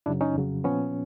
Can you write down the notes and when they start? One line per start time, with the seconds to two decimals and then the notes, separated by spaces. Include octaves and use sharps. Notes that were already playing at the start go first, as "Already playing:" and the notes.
0.06 F#2 C#3 F#3 D4 E4
0.21 C#4 D#4
0.35 F2 C#3 F#3
0.64 A#2 F3 B3 C#4